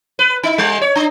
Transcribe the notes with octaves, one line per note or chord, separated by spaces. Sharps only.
B4
D#4
G3
C#5
D4